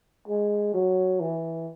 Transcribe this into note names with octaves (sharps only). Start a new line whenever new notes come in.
G#3
F#3
E3